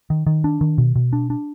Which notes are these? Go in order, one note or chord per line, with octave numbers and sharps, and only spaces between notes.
D#3
D#3
D4
D#3
B2
B2
D4
D4